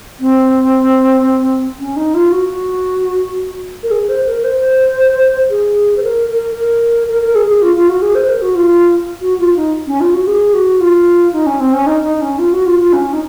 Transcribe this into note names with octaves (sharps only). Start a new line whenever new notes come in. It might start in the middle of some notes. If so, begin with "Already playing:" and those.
C4
C#4
D#4
F4
F#4
A#4
G#4
C5
A#4
C5
G#4
C5
A#4
A#4
A#4
A#4
A#4
G#4
G#4
F4
F4
F#4
G#4
C5
A#4
F#4
F4
F#4
F4
D#4
C#4
F4
F#4
G#4
F#4
F4
D#4
C#4
C4
C#4
D#4
D#4
C#4
F4
F#4
F4
F4
C#4
D#4